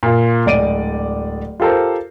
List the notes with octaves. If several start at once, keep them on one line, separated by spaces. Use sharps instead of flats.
A#2 F4
D1 G#3 D5 D7 D#7
F4 G4 A4 A#4 C5